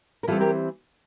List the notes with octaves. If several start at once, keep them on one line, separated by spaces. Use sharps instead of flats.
A#4
E3 G3 C4 F4 A4
G4 A#4